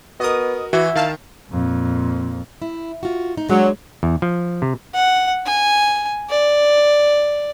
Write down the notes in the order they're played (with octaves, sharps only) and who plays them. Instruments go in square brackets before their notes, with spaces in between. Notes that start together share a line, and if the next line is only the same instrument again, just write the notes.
[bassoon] B3 [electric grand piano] F#4 A#4 [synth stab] D#5 D#6
[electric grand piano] E3 [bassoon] E4 [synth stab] F#4
[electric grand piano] D#3 [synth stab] F5 A5
[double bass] F2 A#2
[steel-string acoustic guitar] E4
F4 F#4
D#4
[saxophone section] F#3 [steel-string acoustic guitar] G#3 D4
[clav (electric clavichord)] E2
F3
C3
[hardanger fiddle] F#5
G#5
D5